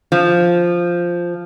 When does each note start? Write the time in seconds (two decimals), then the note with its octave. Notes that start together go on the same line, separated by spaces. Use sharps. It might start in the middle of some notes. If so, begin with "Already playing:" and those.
0.12 F3